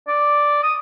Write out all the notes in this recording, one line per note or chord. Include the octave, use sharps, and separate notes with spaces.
D5
D#6